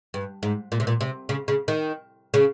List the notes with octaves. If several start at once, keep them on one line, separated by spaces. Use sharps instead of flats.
G2
G#2
A#2
C3
A#2
C3
C#3
C#3
D#3
C#3